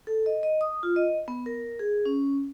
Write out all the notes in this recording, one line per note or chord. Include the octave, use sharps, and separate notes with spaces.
A4
D#5
D#5
D#6
F4
D#5
B3
A#4
G#4
C#4